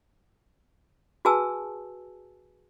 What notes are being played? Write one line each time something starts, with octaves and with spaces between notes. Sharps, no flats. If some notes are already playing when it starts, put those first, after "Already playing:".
F#4 G#4 B4 G#5 A5 E6